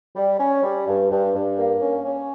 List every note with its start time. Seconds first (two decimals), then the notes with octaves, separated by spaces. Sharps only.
0.16 G3
0.40 C#4
0.63 G3
0.87 G2
1.11 G2
1.34 G2
1.59 A#3
1.82 C#4
2.05 C#4